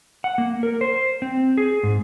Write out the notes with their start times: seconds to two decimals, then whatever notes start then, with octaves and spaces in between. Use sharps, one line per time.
0.24 F#5
0.38 A#3
0.63 A#4
0.81 C5
1.22 C4
1.57 G#4
1.83 G#2